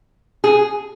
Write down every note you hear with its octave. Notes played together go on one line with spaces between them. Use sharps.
G#4